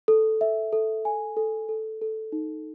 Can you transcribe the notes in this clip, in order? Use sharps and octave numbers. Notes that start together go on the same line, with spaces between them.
A4
E5
A4
G#5
A4
A4
A4
D#4